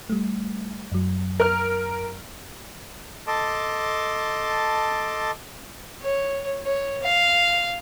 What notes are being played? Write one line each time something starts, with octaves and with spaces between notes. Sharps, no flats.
G3 A3
F#2 F#3
A#4 F6
A4 D#5 A5 C6 D6
C#5
C#5
F5